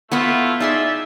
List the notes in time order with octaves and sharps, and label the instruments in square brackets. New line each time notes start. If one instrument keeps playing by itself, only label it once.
[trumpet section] A3 E4 F4 [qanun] B3 F#5 B5
[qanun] D#4 G#4 C6 [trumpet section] E4 D5 E5